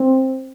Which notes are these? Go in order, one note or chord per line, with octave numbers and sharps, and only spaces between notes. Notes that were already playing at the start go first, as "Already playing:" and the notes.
Already playing: C4